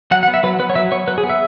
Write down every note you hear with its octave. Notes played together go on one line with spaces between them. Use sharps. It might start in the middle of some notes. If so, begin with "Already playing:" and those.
F#3 F#5
F#5
B3
E5
F#3 B4
B3 B4
C#5
F#3 E5
B3 C#5
F#3 B4
G#4
B3
E5